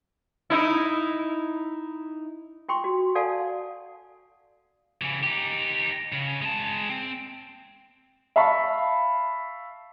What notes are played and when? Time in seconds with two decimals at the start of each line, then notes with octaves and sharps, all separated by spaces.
0.50 D#4 E4
2.69 F4 G5 C6 C#6
2.84 F#4
3.15 A4 D5 F5 F#5 G#5 A5
5.02 C#3 E3
5.23 D#4 G4
6.12 C#3
6.42 G#3 A5
6.89 C4
8.36 E5 F5 A5 B5 C#6